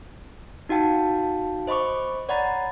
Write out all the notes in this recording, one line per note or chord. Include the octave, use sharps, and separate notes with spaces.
D#4 F#4 F5 G5 A5
C5 D#5 B5 C#6 D6
C#5 D5 F#5 A#5 B5 A6